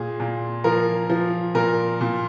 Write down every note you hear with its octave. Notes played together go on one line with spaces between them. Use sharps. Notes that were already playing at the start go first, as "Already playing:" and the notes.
Already playing: A#2 G#4
A#2
F3 A#4
F3
A#2 A#4
A#2